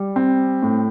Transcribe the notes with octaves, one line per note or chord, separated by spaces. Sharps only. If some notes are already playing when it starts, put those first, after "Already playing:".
Already playing: G3
C4
A2